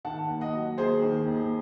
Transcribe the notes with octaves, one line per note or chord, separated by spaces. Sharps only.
D#3 F#5 A5
D#2
D#5 F#5
F#3
D#2 G#4 C5
D#3
D#2